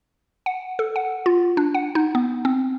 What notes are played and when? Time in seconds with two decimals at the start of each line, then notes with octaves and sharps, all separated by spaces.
0.46 F#5
0.79 A4
0.96 F#5
1.26 F4
1.57 D4
1.75 F#5
1.95 D#4
2.15 B3
2.45 C4